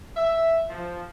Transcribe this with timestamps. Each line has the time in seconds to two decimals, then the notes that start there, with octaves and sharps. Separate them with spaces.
0.16 E5
0.70 F3